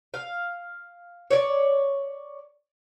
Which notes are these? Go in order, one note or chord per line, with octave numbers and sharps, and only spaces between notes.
F5
C#5 D5